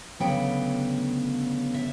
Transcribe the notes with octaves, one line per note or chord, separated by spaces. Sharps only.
D2 C#3 F#3 B3 D4 G5
E5